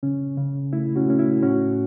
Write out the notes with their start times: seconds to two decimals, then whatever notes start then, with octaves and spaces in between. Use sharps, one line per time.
0.03 C#3 C#4
0.38 C#3
0.73 A3 E4
0.96 C#4 F#4
1.08 A3 C#4
1.19 E4
1.42 A2 C#4 F#4